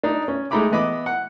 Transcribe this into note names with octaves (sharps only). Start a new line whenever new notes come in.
D4 D#4
C#4
G#3 A3 D#4 A#5 B5 D6
E3 B3 D#5 B5 D6
F#5